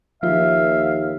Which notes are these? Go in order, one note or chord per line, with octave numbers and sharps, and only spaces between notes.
D#2 F3 F4 E5 F5